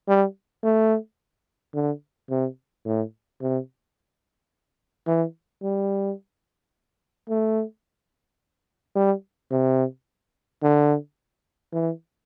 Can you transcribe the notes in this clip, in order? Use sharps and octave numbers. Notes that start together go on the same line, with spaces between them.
G3
A3
D3
C3
A2
C3
E3
G3
A3
G3
C3
D3
E3